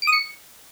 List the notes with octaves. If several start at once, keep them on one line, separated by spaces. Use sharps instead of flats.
D7
D#6
C#7